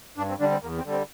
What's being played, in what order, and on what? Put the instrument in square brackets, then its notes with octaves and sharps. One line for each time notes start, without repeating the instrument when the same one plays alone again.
[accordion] G2 D4
C4
D3 G3 D4
C4
E2 A#3
C4
D3 G3
C4